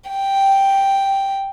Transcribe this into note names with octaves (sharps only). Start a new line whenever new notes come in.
G5